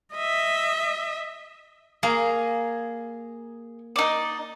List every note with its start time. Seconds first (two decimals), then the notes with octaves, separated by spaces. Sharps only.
0.13 D#5 E5
2.03 A#3 G#4 A#5
3.96 D#4 D5